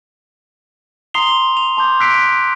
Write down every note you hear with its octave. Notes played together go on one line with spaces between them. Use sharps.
A#5 C6 D#6 C7 F7 G7
C6
F7
A5 C6 D6 G6
D6 E6 F#6 B6 C7 D7